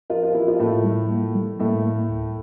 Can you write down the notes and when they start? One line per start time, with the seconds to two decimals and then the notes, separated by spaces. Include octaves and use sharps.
0.10 F3 F4 A#4
0.23 F3 F4
0.34 E3 E4 A#4
0.47 F3 F4
0.59 A2 A3 A#3
0.84 G3
1.10 A#3
1.35 G3
1.59 A2 A3 A#3
1.85 A#3
2.10 D2